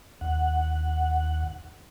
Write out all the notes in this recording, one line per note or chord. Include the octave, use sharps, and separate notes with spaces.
D#2 F#5